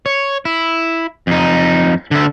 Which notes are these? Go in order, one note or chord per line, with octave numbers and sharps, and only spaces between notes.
C#5
E4
F2 D#4
D3 E5